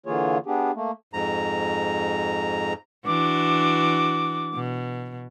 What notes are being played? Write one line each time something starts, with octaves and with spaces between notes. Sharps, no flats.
D3 E3 A#3 F4 G#4 C#5
B3 D4 G4 G#4
A3 A#3
F2 G#2 A#5
E3 D4 F#4 D6
B2